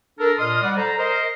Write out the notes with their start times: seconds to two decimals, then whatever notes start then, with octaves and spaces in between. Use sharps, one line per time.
0.20 D4 A4 A#4
0.38 A#2 D#5 C6 D#6 F6
0.63 G3 D5 F#5
0.77 A4 C5 D5 A#5
0.98 A#4 C5 D#5